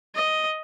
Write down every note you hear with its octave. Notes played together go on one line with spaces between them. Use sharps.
D#5